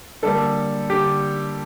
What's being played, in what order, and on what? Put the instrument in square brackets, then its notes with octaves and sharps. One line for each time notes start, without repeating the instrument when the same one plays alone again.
[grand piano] D3 G3 A#3 A4
D3 G4